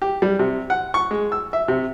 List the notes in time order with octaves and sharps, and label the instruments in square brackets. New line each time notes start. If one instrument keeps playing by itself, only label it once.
[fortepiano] G4
G3
C3
F#5
C#6
G#3
E6
E5
C3